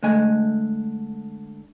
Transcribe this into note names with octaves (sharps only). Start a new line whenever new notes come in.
D3 G#3 A3 D#5 G#5